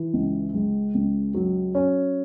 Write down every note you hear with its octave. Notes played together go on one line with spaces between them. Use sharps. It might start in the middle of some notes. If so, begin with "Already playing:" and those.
Already playing: E3
C#2
G#3
C#2
F#3
C#4